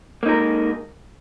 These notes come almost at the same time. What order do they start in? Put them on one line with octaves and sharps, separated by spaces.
A#3 D#4 A#4 G#3